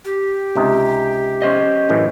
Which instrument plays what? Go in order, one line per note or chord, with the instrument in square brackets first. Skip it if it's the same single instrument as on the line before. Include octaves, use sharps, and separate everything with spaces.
[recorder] G4
[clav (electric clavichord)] C#2 C3 D#4
[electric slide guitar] C#4 C5 D#5
[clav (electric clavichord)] F#2 A2 E3